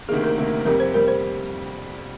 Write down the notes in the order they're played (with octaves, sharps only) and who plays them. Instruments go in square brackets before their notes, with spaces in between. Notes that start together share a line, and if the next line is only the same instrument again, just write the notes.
[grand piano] A#3 [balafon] G#4
[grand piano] D2 C3 D#3
[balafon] A#4
[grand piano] D2 C3 D#3 A#3
[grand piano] F2 C3 G3 [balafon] A#4
[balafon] C5
[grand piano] F2 C3 G3 [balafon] A#4
[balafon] C5